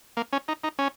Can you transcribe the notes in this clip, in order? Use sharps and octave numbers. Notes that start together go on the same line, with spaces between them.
A#3
C#4
D#4
D#4
C#4